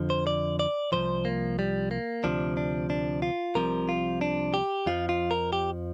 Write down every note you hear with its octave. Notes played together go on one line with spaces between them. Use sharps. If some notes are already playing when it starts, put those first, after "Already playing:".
Already playing: F2 D3 F3
C5
D5
D5
C2 C3 F3 C5
A#3
G3
A#3
D2 C3 F3 D4
D4
D4
F4
C2 C3 F3 A#4
F4
D4
G4
F2 F3 F4
F4
A#4
G4